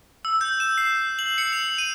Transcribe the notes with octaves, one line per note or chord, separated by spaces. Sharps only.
E6
G6
E7
C7
F#7
C#7
F7
D#7